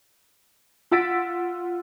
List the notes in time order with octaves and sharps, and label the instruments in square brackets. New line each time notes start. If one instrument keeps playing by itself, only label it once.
[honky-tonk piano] F4 F#5 E6 A6 B6 D7